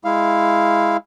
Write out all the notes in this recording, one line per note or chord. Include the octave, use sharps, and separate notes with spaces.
G#3 E4 F5